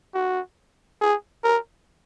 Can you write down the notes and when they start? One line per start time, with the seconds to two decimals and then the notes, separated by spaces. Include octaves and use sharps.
0.14 F#4
1.01 G#4
1.44 A#4